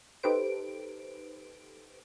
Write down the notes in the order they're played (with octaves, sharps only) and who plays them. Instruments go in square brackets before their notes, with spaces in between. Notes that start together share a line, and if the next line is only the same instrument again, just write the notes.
[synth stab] D#4 G4 A4 B4 C5 D7